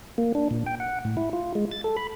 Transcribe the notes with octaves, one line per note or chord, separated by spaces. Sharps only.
A#3
D4
A#2
G5
F#5
A2
E4
F4
G#3
A6
A4
B5